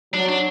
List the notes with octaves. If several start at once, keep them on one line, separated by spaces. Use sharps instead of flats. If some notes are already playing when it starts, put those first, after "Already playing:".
F#3 D4
D4